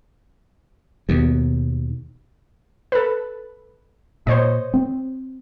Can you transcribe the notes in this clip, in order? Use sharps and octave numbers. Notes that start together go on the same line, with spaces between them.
D#2 B2
A4 B4
A#2 C5 C#5 D#5
C4